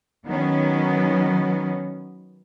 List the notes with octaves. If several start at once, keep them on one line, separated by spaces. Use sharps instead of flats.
D#3 F#3 B3 C#4